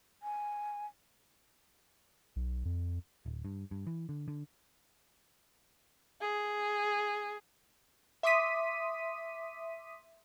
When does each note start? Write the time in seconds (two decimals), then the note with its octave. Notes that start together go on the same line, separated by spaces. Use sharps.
0.23 G#5
2.36 B1
2.65 F2
3.26 D1
3.45 G2
3.71 G2
3.87 E3
4.09 D3
4.28 D3
6.21 G#4
8.23 E5 C6 D6 D#6 B6 D#7